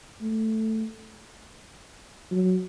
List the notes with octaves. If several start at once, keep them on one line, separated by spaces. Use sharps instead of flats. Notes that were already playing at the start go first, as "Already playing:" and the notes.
A3
F#3